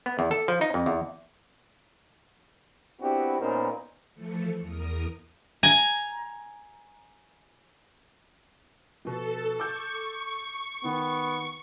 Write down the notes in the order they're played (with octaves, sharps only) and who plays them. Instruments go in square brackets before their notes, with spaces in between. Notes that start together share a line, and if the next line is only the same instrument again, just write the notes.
[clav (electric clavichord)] B3
E2
A4
F3
D#4
F2
E2
[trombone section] B3 C4 D4 E4 F#4 G4
A#2 B3 C#4 D#4 A#4 C5
[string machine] E3 F3 A3 A4 C#7
E2 A#4 D#6
[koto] G#5 A#5
[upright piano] B2 F3 [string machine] A4
[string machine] C#6 [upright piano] D6 E6 G6
[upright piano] D#3 [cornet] B3